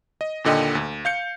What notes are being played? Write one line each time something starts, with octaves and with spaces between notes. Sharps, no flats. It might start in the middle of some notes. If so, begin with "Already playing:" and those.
D#5
D#2 A#2 D3 D#5 G5
D2
F5 G6 C#7